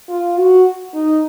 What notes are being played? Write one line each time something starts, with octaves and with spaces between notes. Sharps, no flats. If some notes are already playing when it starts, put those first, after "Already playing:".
F4
F#4
D#4